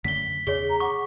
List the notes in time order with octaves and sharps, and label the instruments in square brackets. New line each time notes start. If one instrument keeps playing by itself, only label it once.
[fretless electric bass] F#2 D3 A3 [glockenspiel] B6 G7
[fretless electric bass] E2 C#3 [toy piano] G#4 C#5 [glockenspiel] G7
[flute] A#5
[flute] F#5 [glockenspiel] C#6 [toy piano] D6